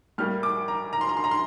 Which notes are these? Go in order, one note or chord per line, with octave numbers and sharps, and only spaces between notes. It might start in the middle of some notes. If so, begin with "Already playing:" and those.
A2 G3 A#3 F6
D6
A#5
A#5
C6
A#5
C6
A#5
C6